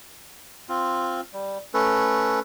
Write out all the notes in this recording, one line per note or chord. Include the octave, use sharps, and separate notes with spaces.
C4 F4
G3
A3 C#4 A4 B4